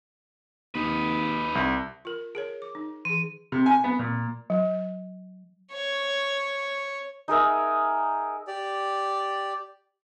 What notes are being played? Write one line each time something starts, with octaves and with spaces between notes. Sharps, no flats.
D#2 D#4 B4
C2
F4 A#4
G#4 A#4 C#5
D6
D#4
E3 G#4 D#7
C3
G#5
B3
A#2
F#3
C#5
D#4 G#4 A#4 E5
G4 D5